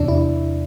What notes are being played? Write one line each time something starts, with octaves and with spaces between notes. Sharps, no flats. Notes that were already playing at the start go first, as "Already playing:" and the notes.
Already playing: E2 C3 E3 D4
E4